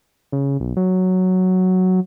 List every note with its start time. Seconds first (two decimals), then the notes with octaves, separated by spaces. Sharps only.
0.32 C#3
0.60 B1
0.77 F#3